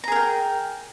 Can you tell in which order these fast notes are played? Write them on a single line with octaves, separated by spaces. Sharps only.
A#5 G#4 A#4 G5